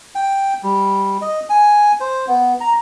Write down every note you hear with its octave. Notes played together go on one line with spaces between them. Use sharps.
G5
G3
D#5
G#5
C5
B3
A#5